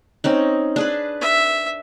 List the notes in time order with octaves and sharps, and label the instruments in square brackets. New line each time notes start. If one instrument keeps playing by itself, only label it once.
[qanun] C4 C#4 D#4
D4 G#4 B4
[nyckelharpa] E5